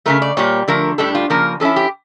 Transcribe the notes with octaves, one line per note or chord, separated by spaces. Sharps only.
C#3 E3 A3 A#4
D5
A#2 G3 A#3 C#5
D3 F3 A3 A#4
A2 G3 D4 A4
F4
C#3 F3 A#3 A#4
F3 C#4 E4 A4
G4